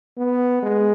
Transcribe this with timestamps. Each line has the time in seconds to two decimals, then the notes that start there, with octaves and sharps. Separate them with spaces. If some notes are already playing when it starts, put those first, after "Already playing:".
0.17 B3
0.63 G#3